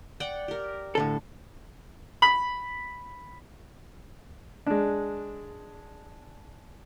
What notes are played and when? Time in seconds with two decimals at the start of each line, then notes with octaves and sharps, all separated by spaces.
0.20 D5 F#5 G5
0.48 G4 A#4
0.95 A2 D3 A4
2.22 B5
4.67 G#3 D4